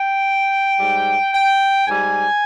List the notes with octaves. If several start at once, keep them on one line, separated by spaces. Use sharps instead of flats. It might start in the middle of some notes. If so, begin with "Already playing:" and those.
Already playing: G5
G#2 G3
G5
G#2 G3 G#5